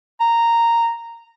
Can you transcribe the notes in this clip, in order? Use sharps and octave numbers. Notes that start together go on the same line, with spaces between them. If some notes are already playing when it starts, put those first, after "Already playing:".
A#5